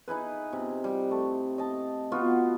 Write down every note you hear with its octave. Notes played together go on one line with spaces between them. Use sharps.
D#4 E4 G#4 B4
C3
G3
A3
D#5 A5
B3 F4 F#4